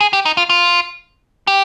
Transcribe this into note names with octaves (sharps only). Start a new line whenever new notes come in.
G#4
G4
D#4
F4
F4
G4